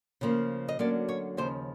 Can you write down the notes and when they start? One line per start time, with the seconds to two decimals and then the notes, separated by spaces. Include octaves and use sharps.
0.21 C#3 F3 A#3
0.68 D#5
0.79 D3 F#3 A#3 C#4 D5
1.08 C#5
1.37 D#2 C#3 F3 C5